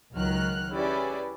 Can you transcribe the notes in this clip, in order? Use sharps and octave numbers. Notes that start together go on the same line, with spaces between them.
C#2 D#3 F#3 F6 F#6
C#4 E4 G4 G#4 B4 D5